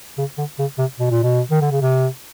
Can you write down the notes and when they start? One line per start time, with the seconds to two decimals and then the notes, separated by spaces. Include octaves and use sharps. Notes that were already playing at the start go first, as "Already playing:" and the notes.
0.18 C#3
0.38 D3
0.59 C#3
0.78 C3
0.99 B2
1.10 A#2
1.23 B2
1.51 D#3
1.62 D3
1.71 C#3
1.82 C3